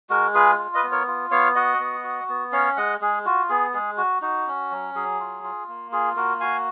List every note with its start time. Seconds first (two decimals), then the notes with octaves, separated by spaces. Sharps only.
0.10 G#3 F#4 A#4
0.34 F4 G#4 B4
0.58 F4
0.75 B4 D#5
0.83 B3
0.92 A#4 C#5
1.08 F4
1.31 B3 C#5 F5
1.55 F#4 D#5 F#5
1.80 B3
2.04 F#4
2.29 B3
2.52 C#4 C#5 F5
2.76 G#3 D#5 F#5
3.01 G#3 G#4
3.25 F4 F#4
3.49 B3 G#4
3.74 G#3 G#4
3.98 F#4
4.22 D#4 F#4
4.47 C#4
4.71 F#3
4.95 F#3 G#4
5.20 F4
5.43 F4
5.68 A#3
5.92 F4 G#4
6.16 A#3 F#4 A#4
6.40 F#4 F5 G#5